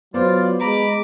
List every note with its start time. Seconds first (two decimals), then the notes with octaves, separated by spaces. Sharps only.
0.14 F#3 B3 F4 C5 D5
0.60 G#3 A#5 B5 D6